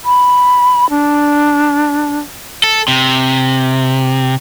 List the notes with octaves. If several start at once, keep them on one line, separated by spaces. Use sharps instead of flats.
B5
D4
A4
C3